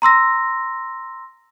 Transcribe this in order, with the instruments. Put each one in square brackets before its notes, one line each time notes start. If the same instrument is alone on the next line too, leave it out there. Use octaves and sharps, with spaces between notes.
[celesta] A#5 C6 E6 A#6